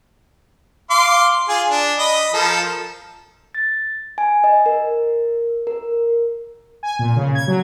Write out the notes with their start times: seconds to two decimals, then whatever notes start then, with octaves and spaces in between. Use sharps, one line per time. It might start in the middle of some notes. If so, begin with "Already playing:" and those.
0.90 F5 C6 D6
1.49 F4 G#4 G#5
1.68 D4
1.99 D#5 B5
2.34 F3 A4 A#4
3.55 A6
4.18 G#5
4.44 D#5
4.66 A#4
5.67 A#4
6.83 G#5
6.99 A#2
7.16 C#3
7.35 G#6
7.47 F#3